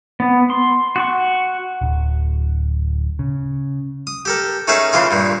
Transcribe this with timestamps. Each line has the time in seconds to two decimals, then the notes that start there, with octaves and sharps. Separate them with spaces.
0.20 B3
0.50 C6
0.96 F#4 C#6
1.81 D1
3.19 C#3
4.07 D#6
4.25 G4 A4 A#4
4.68 A3 C#4 D#4 G#4 A#4 E5
4.93 C#3 E3 F4 G#4
5.11 G2 A#2